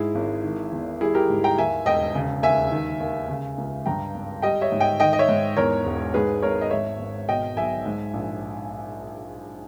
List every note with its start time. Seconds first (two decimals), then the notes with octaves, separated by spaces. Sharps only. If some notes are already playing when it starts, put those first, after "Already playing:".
Already playing: G#2 E4 G#4
0.15 G#1
0.44 D#3
0.72 E2
1.01 G3 E4 G#4
1.15 G4 A#4
1.30 G#2
1.44 G5 A#5
1.57 D#2 E5 G#5
1.86 E1 D#5 G5
2.15 C#3
2.43 D#2 E5 G#5
2.72 D#3
3.00 D#2
3.29 C#3
3.58 C#2
3.86 G2 G5 A#5
4.14 G#1
4.42 G3 D#5 G5
4.61 C#5 E5
4.72 G#2
4.80 D#5 G5
5.00 D#3 D#5 G5
5.13 D#5
5.19 C#5 E5
5.29 G#2
5.57 E2 A#4 C#5
5.85 E1
6.14 G#2 G#4 B4
6.42 G#1 A#4 C#5
6.61 D#5
6.71 G#2 C#5 E5
6.99 G#1
7.28 B2 D#5 G5
7.57 B1 E5 G#5
7.86 G#2
8.13 A#1